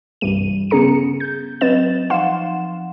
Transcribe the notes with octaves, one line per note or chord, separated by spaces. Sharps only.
C2 G2 E3 G3 D#7
C#3 B3 C#4 G#4 A#5 C#7
G6
F#3 C4 B4 D#5 A6 E7
F3 D#4 F5 F#5 C6 E7